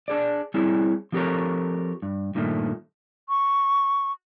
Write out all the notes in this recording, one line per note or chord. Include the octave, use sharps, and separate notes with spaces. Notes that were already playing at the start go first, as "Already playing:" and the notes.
D4 G#4 D5
G3 C4 C#4 E4 G#4
F3 C4 G4 A4 A#4 C#5
G2
G2 A#2 D#3 A3
C#6